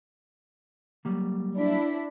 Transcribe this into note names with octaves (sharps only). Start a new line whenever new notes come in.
F#3 G3 A#3
D4 E4 B6